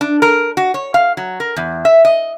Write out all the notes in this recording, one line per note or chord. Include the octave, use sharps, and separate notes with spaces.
D4
A#4
F#4
C#5
F5
F#3
A#4
E2
E5
D#5